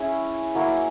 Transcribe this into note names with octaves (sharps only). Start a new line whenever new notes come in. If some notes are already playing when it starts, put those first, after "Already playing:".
Already playing: C#4 E4 G#4 E5
F#3 A#3 E4